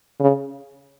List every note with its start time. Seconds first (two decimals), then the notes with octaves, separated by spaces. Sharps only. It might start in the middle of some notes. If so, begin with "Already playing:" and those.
0.20 C#3